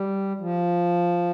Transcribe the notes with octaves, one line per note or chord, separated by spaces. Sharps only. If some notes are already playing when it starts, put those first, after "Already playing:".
Already playing: G3
F3